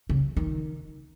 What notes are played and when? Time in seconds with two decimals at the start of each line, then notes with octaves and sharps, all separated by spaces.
0.09 C#3
0.37 D#3